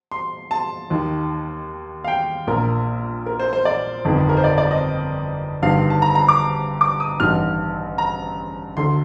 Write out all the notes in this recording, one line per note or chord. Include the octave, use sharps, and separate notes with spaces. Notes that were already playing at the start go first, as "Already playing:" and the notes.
C6
A5
D#2 D#3
F5
G5
A#1 A#2 A#4
A#4
C5
C5
D5
G1 F2 D#3
A#4
C5
D5
D5
D#5
G1 G2 D#3 F5
A5
A#5
A#5
D6
D6
D#6
A1 G2 D#3 F6
A#5
D2 D3 C6